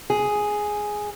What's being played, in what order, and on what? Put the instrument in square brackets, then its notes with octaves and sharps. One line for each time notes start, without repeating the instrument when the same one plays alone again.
[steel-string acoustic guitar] G#4